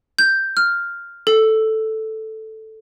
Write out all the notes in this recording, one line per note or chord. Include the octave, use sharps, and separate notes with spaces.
G6
F6
A4